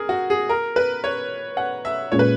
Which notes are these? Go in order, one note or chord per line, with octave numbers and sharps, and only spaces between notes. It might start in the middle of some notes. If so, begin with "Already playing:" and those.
Already playing: G#4 A#4
F#4
G#4
A#4
B4
C#5
F#5
E5
A#2 G#3 C#4 C#5
B4